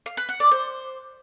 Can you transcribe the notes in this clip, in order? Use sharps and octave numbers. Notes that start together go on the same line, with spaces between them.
F5
B4
F#5
D5
C5